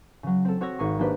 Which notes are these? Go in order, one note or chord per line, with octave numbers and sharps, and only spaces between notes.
C#3 F#3
C4 A4
C4 F#4 C#5 C#6 E6 A#6
G#1 G#4 C#6 C#7
G#3 A#3 D4 G4 B4 C5